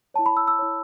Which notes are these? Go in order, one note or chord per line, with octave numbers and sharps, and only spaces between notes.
E4 C#5 A5
B5
E6
E6
E4 C#5